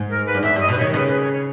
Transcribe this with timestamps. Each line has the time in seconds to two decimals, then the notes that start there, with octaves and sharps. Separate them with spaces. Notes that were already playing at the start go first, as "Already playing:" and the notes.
Already playing: G#2
0.09 A#4
0.26 B4
0.35 G2
0.42 E2 E5
0.56 G2 D#5
0.68 B2 B4
0.77 D#3 C#5
0.94 C#3 B4
1.07 B4
1.20 C#5
1.32 C#5